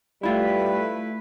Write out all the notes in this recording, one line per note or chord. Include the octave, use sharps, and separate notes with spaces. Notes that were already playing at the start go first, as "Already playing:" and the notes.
G3 A3 E4 F4 B4